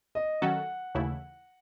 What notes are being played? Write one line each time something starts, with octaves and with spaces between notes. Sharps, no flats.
D#5
D#3 F#3 C#4 F#4 A4 F#5
D#2 C#3 E3 A3 E4